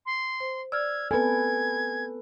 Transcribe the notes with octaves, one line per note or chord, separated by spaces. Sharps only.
C6
C5
D5 E6 F6 G#6
B3 C4 A4 B4 G#5 G#6